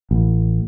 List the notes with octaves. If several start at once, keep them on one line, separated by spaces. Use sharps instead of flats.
A1